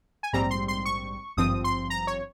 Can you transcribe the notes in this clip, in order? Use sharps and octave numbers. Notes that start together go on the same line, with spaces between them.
G#5
A#1 G#2 G3 C4 A#5
C6
C6
C#6
G#1 G2 F3 C4 D#6
C6
A#5
C#5